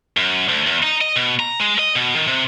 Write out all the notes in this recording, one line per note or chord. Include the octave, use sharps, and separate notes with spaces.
F#2
D2
E2
D#4
D#5
B2
A#5
G#3
D#5
B2
D#3
C3